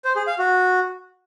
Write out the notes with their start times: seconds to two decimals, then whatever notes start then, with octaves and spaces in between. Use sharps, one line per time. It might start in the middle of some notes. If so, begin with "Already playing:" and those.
0.05 C5
0.16 G#4
0.27 F5
0.38 F#4